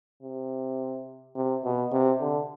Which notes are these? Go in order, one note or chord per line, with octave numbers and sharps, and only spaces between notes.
C3
C3
B2
C3
D3